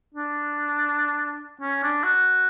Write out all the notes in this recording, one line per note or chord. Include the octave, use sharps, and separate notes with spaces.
D4
C#4
D4
F#4